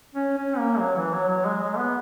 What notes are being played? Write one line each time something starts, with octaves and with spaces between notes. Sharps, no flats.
C#4
C#4
A#3
F#3
E3
F#3
F#3
G#3
G#3
B3